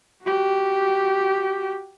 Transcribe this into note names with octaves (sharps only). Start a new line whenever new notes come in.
F#4 G4